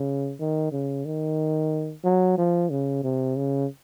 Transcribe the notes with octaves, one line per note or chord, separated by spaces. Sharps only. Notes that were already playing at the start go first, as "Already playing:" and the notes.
Already playing: C#3
D#3
C#3
D#3
F#3
F3
C#3
C3
C#3